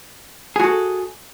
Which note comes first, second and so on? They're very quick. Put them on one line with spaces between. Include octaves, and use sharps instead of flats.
G#4 F#4 A4